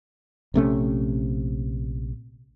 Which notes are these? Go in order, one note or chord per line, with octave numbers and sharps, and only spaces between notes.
A#1 C3 A3 C#4